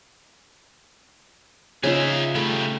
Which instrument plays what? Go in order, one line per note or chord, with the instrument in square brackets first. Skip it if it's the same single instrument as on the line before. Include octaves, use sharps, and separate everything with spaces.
[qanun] C#3 D#4 F4 [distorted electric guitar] G#4 E5
[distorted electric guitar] C#3 G3 [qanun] A3